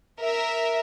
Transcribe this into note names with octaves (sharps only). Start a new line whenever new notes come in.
A#4 E5